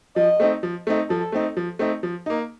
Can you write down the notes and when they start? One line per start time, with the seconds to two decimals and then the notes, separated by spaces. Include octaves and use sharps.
0.16 F3 D#5
0.40 A3 C4 D#4
0.63 F3
0.87 A3 C4 D#4
1.10 F3 A4
1.32 A3 C4 D#4
1.57 F3
1.79 A3 C4 D#4
2.03 F3
2.26 A#3 D#4